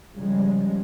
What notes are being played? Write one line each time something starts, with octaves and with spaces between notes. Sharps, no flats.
C#3 F3 G3 G#3